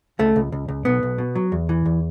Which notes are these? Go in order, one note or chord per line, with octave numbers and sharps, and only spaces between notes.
C#2 A3
C#2
C#2
C#2
B1 B3
B1
B2
F#3
E2
E3
E2